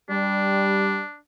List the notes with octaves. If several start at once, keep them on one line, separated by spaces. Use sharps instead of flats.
G3 D4